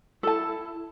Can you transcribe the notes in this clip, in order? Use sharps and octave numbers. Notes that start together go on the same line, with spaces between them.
E4 A4 A5